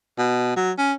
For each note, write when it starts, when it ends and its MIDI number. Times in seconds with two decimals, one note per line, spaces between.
0.18 0.56 47
0.56 0.72 54
0.78 0.93 61